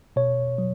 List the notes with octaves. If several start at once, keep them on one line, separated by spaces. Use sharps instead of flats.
B2 C#5
F#3